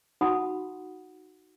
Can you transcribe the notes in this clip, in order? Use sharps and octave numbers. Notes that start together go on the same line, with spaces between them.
D#4 F#4 F#5 A5 B5 D#6